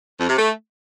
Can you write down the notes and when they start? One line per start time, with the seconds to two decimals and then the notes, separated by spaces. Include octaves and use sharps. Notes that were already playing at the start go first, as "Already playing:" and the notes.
0.19 F2
0.29 C3
0.38 A3